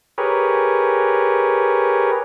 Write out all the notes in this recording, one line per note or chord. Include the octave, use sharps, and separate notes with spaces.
G4 G#4 A#4 B4 C#5